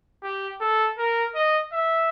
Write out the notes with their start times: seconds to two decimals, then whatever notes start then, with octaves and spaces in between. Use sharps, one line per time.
0.23 G4
0.61 A4
0.98 A#4
1.35 D#5
1.73 E5